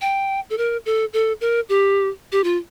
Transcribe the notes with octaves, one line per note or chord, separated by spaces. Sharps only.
G5
A4
A#4
A4
A4
A#4
G4
G4
F4